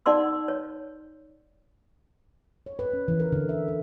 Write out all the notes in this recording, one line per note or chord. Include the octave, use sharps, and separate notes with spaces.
D#4 D5 F#5 C6 E6
C#5
C#5
B4
C#4
E3
A#4
D3
E5
B4